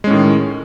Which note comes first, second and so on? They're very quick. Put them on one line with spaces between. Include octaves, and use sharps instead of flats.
G#3 C#4 A2 D#3